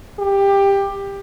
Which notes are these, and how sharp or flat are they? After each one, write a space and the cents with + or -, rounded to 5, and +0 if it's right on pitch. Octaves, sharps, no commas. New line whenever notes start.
G4 +15